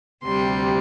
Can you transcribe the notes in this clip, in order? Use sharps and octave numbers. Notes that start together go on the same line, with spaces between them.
D2 C3 G3 C6